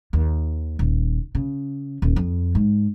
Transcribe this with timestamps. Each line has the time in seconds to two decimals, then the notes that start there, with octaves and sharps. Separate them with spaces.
0.13 D#2
0.79 D#1
1.35 C#3
2.02 D#1
2.16 F2
2.55 G#2